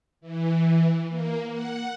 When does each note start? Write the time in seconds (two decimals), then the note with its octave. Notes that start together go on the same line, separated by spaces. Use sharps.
0.21 E3
1.10 A#3
1.51 F#5